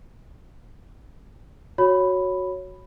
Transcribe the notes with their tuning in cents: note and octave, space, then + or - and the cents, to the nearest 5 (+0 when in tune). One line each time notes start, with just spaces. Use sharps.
F#4 -5 C#5 +0 B5 +0